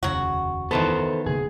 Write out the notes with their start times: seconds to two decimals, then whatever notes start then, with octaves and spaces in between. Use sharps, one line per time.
0.03 F1 D#2 C#3 F#3 F#4
0.71 D#3 E3 B3 A4 C5 A5
1.26 E1 C#3 A#3 G#4